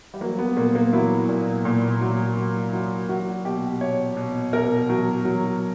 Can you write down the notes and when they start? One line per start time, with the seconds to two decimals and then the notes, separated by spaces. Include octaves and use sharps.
0.14 G3
0.21 F#3 A#3
0.39 B3
0.57 A#2 A#3
0.75 A#3
0.93 F#3 E4
1.29 A#2
1.65 A#2
2.01 F#3
2.37 F#3
2.73 F#3
3.09 F#3 F#4
3.45 B2 G4
3.81 B2 C#5
4.17 B2
4.53 B2 A#4
4.89 F#3
5.25 F#3